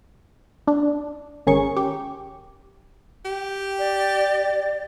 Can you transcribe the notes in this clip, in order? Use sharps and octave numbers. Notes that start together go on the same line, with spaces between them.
D4
G#1 C#4 G#4 A#4 C#6
G4
G4
D5